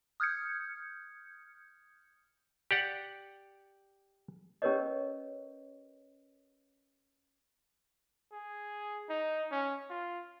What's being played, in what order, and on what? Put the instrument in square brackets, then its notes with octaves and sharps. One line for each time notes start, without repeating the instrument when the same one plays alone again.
[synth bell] D#6 F6 G6 G#6 C#7
[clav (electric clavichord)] G4 D5 F#5
[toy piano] C#4 G4 A#4 B4 C#5 D#5
[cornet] G#4
D#4
C#4
F4